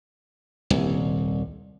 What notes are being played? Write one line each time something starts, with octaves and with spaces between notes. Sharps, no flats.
D#1 C2